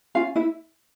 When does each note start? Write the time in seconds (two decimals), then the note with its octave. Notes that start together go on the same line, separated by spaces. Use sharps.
0.15 C#4 F4 F5
0.36 E4 E5